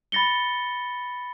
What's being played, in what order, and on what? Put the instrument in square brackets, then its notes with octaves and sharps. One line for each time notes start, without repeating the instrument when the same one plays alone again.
[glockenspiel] B5 A6 A#6 C#7 G7